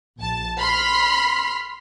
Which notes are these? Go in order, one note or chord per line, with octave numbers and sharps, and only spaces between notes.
A#1 A5
B5 C6 F6 B6